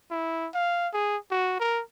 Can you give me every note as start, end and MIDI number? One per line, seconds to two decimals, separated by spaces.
0.11 0.49 64
0.54 0.88 77
0.93 1.17 68
1.31 1.55 66
1.60 1.82 70